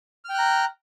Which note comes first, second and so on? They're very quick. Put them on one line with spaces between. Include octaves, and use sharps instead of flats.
F6 G5 F#6 A#5